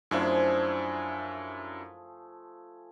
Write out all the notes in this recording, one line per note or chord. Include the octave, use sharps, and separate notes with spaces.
F#2 F3 A3 D4 E4 G#4